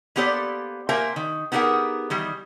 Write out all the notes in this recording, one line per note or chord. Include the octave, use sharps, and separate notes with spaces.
A#3 B3 G4 A4 C5 D5
A#3 A#4 C5 E5 G5 G#5
D#3
B3 D#4 G4 G#4 A#4 F#5
D#3 E3 G3